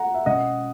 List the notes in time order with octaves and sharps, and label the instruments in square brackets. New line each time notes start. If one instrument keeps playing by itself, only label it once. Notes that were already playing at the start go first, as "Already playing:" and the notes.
Already playing: [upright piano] F#5 A#5
E5
[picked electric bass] B2 G#3 C#4 [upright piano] D#5 F#5